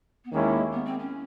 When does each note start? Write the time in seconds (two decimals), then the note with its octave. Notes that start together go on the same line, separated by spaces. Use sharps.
0.25 B3
0.32 D#2 D#3 G#3 A#3 C#4 E4
0.73 B3
0.86 C4
0.99 C#4